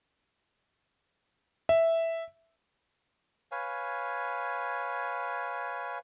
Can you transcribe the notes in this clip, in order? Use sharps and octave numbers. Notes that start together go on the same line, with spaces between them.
E5
B4 C#5 F5 G#5